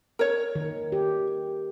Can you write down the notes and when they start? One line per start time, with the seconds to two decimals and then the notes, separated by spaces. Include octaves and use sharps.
0.19 A#4 C#5
0.55 D#3
0.92 G4